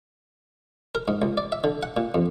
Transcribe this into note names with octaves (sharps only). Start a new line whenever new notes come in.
A#4
G#2
C#2
D5
E5
D3
F#5
A#2
F2